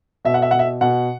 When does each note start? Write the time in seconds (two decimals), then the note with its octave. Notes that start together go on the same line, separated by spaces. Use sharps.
0.25 B2 E5
0.34 F#5
0.42 E5
0.51 B2 F#5
0.59 E5
0.81 B2 F#5